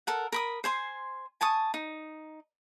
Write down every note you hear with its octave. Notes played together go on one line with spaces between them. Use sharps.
A4 A#4 F#5
A#4 B5 D#6
C5 G#5 C6
G#5 A5 C#6 D#6
D#4